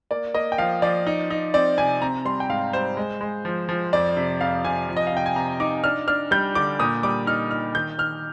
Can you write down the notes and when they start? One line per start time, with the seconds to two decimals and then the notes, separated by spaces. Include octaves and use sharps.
0.11 A#3 D5
0.34 A#3 D#5
0.52 G5
0.58 F3 F5
0.82 F3 D5
1.07 D#4
1.30 D#4
1.54 C4 D5
1.78 C3 G#5
2.02 C4 A#5
2.25 G3 C6
2.40 G5
2.49 G#2 F5
2.73 G3 C5
2.97 G#3
3.21 G#3
3.45 F3
3.69 F3
3.93 F2 D5
4.17 C3
4.41 F2 F5
4.65 C3 G#5
4.88 F3
4.97 D#5
5.07 F5
5.12 C3 G5
5.26 G#5
5.36 C3 A#5
5.60 D#4 D6
5.84 D4 F6
6.08 D4 F6
6.31 G3 G6
6.55 D3 D6
6.80 A#2 D#6
7.03 G3 D6
7.27 D#4 F6
7.51 D#4 F6
7.75 D#3 G6
7.98 D#3 F6